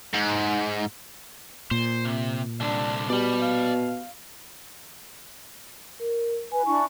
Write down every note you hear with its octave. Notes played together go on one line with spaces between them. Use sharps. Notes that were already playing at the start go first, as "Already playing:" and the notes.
G#2
A#2 C5
C3
C2 D3 D4
B2 G3 D5 B5
F5
A#4
B4 G#5
D4 E4 C#6